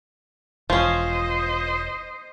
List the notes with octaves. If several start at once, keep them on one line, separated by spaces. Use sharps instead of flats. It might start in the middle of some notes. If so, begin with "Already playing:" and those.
E1 F3 C#4 C5 D#5